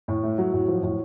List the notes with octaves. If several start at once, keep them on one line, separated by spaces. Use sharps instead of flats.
A2
A3
F#3
A2
F3
A2